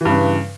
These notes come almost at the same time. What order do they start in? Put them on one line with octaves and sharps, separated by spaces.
E3 G2 C#3